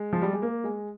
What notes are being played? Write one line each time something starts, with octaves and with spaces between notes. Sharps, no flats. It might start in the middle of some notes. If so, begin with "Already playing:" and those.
Already playing: G#3
F3
G3
G#3
A#3
G#3